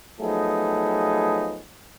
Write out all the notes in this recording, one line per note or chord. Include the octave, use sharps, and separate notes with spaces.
F3 F#3 A3 B3 D#4 G#4